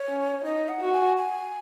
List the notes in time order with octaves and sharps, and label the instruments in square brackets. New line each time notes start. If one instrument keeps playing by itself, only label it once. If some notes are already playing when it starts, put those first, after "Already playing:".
Already playing: [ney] C#5
[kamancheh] C#4
[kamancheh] D#4 [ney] D#5
[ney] F#5
[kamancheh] F#4
[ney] G#5
G#5